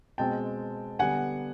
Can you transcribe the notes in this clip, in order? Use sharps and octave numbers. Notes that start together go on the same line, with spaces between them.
B2 G#3 C4 G5 A5
D3 G3 B3 F#5 G#5